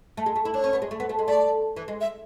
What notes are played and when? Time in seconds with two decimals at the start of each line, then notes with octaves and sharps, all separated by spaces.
0.17 A3
0.26 G#3
0.36 A3
0.45 E4
0.54 D4 C#5
0.64 C#4
0.73 B3
0.82 G#3
0.91 A3
1.00 B3
1.09 A3
1.19 G#3
1.27 A3 D5
1.76 E3
1.88 G#3
2.01 E5